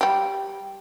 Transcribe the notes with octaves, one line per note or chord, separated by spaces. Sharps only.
G3 G4